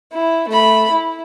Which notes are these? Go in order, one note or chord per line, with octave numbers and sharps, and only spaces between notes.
E4
A3 B5
E4